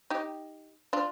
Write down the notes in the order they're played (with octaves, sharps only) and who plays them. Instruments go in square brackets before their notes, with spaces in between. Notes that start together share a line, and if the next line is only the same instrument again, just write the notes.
[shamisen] D#4 G4
D4 F4